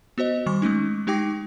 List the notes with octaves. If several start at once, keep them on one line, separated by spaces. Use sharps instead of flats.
B3 F#4 C5 D#5
D#3 G3 C#6 D6
G#3 A3 C#4 D#4
G#3 D#4 G4 G5 D6 A#6